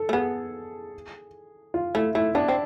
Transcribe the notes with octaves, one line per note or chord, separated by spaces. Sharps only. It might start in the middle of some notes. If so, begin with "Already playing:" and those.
Already playing: A4
A3
B3 G#4
F4
A3 E4
A3 E4
B3 D4
C4